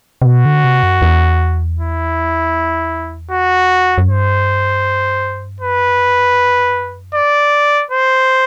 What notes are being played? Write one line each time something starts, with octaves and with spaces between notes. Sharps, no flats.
C3
B2 F#4
D3
C3
F#2
E2
E4
F#4
F#2
G2 C5
F#2 B4
D5
C5